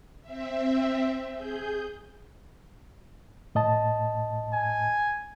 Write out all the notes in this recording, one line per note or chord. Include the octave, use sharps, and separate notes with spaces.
C4 E5
G#4 G6
A2 D#5 A5
G#5